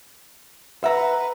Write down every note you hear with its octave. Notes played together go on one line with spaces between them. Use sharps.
B4 E5 F#5 A#5